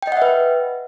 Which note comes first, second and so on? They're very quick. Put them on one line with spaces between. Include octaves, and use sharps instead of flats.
G5 D#5 F#5 E5 B4